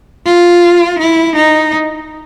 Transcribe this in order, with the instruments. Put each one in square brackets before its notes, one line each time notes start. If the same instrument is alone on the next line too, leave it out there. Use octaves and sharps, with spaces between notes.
[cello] F4
E4
D#4